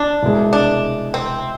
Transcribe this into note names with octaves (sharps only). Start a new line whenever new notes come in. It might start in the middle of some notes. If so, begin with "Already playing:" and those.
Already playing: D4
C2 B2 G#3
D4
C4